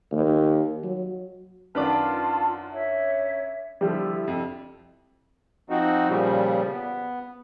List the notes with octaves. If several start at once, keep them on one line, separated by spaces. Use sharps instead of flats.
D#2
F#3
F#2 D#3 D4 F4 B4 A5 D6 F6
C#5 E5
D3 F3 G3 E4
F2
F3 C4 D#4 F#4
A#2 C#3 F3 G3
B3